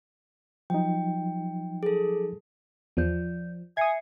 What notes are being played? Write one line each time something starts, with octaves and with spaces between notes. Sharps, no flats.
F3 F#3 D#4 G5
G#4 A4
E2 F3 D5 G6
E5 G#5 D#6 G#6 C7 C#7